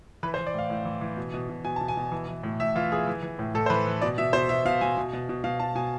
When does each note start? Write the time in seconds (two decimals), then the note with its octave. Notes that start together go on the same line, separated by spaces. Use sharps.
0.23 E3 B4
0.34 C5
0.38 E3
0.47 D5
0.54 A2 F5
0.70 A2
0.85 E3
1.01 E3
1.17 B2
1.34 B2
1.49 B2
1.64 B2 G#5
1.76 B2 A5
1.88 G#5
1.97 B2
2.12 E3
2.28 E3
2.43 A2
2.60 A2 E5
2.75 E3 F4
2.92 E3 G#4
3.07 E3
3.23 E3
3.39 A2
3.54 A2 A4
3.66 C5
3.70 E3 B4
3.87 E3
4.02 B2 D5
4.18 B2 E5
4.33 B2 C5
4.49 B2 E5
4.65 B2 F5
4.81 B2 G#5
4.97 B2
5.13 B2
5.29 B2
5.44 B2 F5
5.60 B2 A5
5.75 B2 G#5